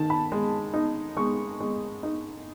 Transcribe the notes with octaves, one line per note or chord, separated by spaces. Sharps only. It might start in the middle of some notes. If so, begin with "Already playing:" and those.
Already playing: D#3 A5
B5
G#3
D#4
G#3 C#6
G#3
D#4